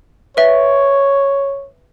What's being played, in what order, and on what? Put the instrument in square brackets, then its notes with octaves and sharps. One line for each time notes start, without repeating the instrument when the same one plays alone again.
[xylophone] B4 E5 [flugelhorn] C#5